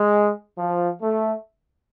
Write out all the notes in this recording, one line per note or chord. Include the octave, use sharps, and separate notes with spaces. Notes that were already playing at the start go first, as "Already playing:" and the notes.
Already playing: G#3
F3
A3